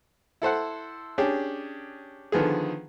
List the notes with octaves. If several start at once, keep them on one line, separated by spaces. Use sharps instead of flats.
E4 A4 C5 F#5
C#4 D4 G4 G#4
D3 D#3 F3 B3 G#4